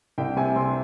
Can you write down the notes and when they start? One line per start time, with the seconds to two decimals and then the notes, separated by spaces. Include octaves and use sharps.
0.18 C2 G5
0.36 C3 G#5
0.56 C3 C6